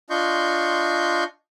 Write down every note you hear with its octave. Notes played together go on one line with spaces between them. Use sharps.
D4 F4 D#5 C6 C#6 G6